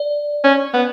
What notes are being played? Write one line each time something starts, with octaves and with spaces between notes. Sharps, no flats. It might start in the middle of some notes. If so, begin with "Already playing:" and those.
Already playing: D5
C#4
B3